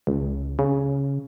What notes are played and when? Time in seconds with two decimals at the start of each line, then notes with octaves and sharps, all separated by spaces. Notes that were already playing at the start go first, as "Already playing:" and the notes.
0.07 C#2
0.59 C#3